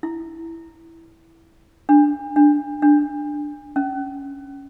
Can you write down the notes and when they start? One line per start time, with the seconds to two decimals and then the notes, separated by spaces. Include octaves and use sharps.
0.03 E4
1.89 D4
2.36 D4
2.82 D4
3.76 C#4